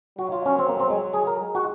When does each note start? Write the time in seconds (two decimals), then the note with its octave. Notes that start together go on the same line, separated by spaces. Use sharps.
0.18 F#3 F#4
0.32 F4
0.46 C#4
0.59 C4
0.69 A#3
0.80 C4
0.90 G#3
1.13 G#4
1.27 A#4
1.41 G#3
1.55 F#4